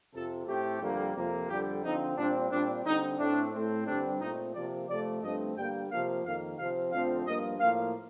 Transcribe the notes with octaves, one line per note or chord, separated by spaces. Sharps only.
F2 C3 F3 A4
A2 A3 C4 G4
F2 D3 G3 A#3
F2 C3 F3 A#3
F2 D3 G3 G4
D3 F3 C4 D#4
A#2 G3 C4 D4
A#2 G3 C4 D4
D3 G3 C4 D#4
A2 A3 C4 D4
A2 A3 C4
G2 D3 G3 C4 D4
A#2 A3 C4 D#4
C3 F3 A#3 D5
C3 F3 A3 D5
G2 F3 A3 C4 D#5
G2 D3 G3 A#3 G5
C3 F3 A#3 F5
F2 D#3 A#3 F5
C3 F3 C4 F5
F2 D3 F3 A3 C4 F5
G2 F3 A#3 D#5
A2 F3 A#3 F5